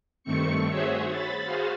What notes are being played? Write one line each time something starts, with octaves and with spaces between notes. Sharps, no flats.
G2 D#3 A3 C4 C#6 C#7
F#4 G#4 C5 C#5 E5
B5 A6
F#4 G#4 C5 F5